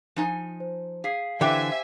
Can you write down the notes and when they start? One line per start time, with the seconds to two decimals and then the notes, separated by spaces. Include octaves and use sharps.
0.16 F3 D#4 G#5
0.60 C5
1.04 G#4 F5 B6 C7
1.41 D3 E3 G4 C5 E5 G5 G#5